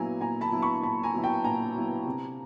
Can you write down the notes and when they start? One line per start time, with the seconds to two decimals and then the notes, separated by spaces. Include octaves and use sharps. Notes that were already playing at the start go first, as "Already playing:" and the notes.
Already playing: A#2 F#3 B3 E4 G#5 A#5
0.21 A#2 G#5 A#5
0.41 A5 B5
0.52 F#3 B3 E4
0.62 B5 C#6
0.83 A#2 A5 B5
1.03 G#5 A#5
1.14 F#3 B3 E4
1.24 G5 A5
1.44 A#2 G#5 A#5
1.75 F#3 B3 E4
2.05 C3